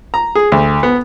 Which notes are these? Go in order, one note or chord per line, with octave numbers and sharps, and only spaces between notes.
A#5
G#4
D2
B3